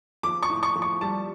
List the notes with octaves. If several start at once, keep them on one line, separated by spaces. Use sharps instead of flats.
F3 D6
C#6
A2
C#6
F3
C#6
G3 A5